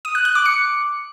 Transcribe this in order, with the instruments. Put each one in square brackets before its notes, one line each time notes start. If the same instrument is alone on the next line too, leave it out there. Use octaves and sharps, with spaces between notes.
[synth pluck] D#6
F#6
F#6
D6
C#7